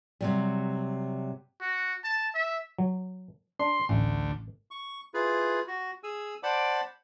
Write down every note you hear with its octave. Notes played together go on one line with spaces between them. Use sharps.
C3 F#3 G3
F#4
A5
E5
F#3
D4 C6
A1 D2
C#6
E4 F4 G#4 B4
F#4
G#4 G#5 E6
C5 D5 F#5 A5 B5 D6